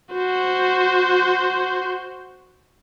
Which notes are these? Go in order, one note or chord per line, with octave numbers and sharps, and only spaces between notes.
F#4 C5